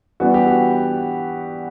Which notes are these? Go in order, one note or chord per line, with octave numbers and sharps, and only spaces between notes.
E3 G3 B3 D4 F#4
G4
F#4